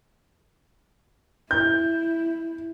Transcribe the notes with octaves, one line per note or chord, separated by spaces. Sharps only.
E4 G6